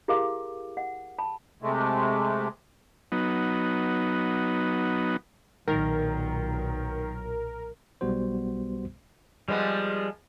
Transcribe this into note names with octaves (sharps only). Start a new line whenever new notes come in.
E4 G4 G#4 A#4 F5 D6
F#5
A5 B5
C3 G#3 A3
F#3 B3 D#4
B1 A#2 D#3 F#3 A#4
B1 G3 B3 F#4 C5
F3 G3 G#3 B3